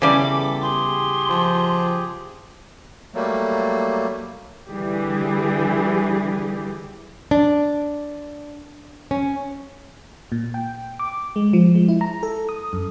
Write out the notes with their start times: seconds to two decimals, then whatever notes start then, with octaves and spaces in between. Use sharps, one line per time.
0.02 E2 C#3 E3 G3 A4 B5 D6
0.61 G4 G#4 C6
1.30 F3
3.15 F#3 G3 A3 A#3
4.69 D3 E3 G3 G4 G#4
7.31 D4
9.11 C#4
10.32 A#2
10.54 G5
10.99 D6
11.36 G#3
11.53 F3
11.75 G#3
11.89 E4
12.01 A#5
12.23 A4
12.49 D#6
12.73 F#2